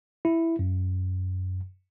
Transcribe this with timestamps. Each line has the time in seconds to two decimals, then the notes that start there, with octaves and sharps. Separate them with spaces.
0.25 E4
0.59 F#2